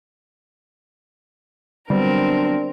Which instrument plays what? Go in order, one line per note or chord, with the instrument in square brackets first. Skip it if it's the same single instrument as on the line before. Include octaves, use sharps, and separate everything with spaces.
[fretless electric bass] D3 F#3 B3 [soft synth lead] G3 [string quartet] C4 A#4 [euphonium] D4